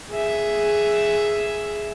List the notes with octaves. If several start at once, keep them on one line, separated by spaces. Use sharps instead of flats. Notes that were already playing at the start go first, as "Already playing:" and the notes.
G#4 E5